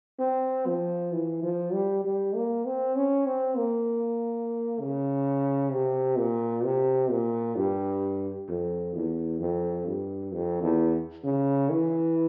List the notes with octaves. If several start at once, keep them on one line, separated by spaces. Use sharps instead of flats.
C4
F3
E3
F3
G3
G3
A#3
C4
C#4
C4
A#3
C#3
C3
A#2
C3
A#2
G2
F2
E2
F2
G2
F2
E2
C#3
E3